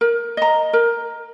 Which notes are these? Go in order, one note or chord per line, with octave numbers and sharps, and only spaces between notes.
A#4
D#5 A#5
A#4